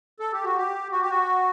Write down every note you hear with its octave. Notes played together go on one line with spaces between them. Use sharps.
A4
G4
F#4
G4
F#4
G4
F#4